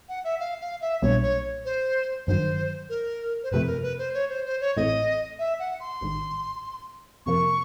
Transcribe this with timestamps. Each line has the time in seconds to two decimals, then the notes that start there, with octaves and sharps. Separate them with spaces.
0.09 F#5
0.24 E5
0.40 F5
0.61 F5
0.81 E5
1.02 B1 A#2 G3 B3 D4 C#5
1.23 C#5
1.65 C5
2.27 G1 G2 D#3 F#3 C5
2.89 A#4
3.43 C5
3.51 G1 F2 C3 F3 A3 B4
3.67 A#4
3.83 B4
3.98 C5
4.14 C#5
4.29 C5
4.45 C5
4.61 C#5
4.76 A1 A2 E3 A3 C4 D#5
5.39 E5
5.60 F#5
5.80 C6
6.01 A1 G#2 D#3
7.26 F2 C3 F3 A#3 C#6